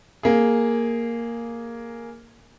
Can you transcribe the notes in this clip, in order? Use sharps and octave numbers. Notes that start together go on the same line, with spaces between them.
A#3 G#4